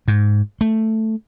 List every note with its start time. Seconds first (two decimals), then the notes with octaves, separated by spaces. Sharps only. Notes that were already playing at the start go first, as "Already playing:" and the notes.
0.08 G#2
0.61 A3